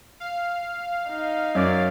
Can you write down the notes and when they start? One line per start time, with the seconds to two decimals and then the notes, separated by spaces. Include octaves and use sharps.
0.20 F5
1.10 D#4
1.55 F#2 C#5 D5